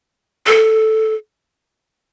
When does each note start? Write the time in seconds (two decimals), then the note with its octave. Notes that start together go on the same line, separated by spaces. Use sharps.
0.46 A4